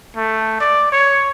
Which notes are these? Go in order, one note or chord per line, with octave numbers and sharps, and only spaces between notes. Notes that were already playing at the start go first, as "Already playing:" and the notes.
A3
D5
C#5